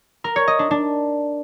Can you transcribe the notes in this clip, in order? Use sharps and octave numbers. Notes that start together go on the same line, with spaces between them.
A#4
C#5
D#5
D4
D4